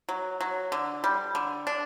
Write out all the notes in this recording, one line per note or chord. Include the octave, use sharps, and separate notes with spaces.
F#3
F#3
D3
G3
D3
D4